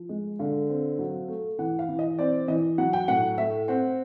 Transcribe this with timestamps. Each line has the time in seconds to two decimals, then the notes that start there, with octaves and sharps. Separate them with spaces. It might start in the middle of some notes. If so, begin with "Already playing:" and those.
Already playing: F3
0.09 G#3
0.39 D3 F5
0.69 C4
0.99 F#3
1.28 A3
1.59 E3 F#5
1.79 F5
1.89 E3
1.99 D#5
2.19 C4 D5
2.48 E3 D#5
2.78 F#3 F#5
2.93 G5
3.08 A2 F#5
3.38 A3 E5
3.68 C4 F#5